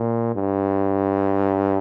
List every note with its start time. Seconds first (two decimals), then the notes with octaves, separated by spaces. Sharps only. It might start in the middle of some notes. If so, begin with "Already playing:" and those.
Already playing: A#2
0.35 G2